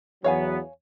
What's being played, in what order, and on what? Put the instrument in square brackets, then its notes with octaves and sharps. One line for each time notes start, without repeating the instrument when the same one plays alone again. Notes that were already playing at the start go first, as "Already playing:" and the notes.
[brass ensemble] E2 F#3 B3 [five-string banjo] C#5 F5 G#5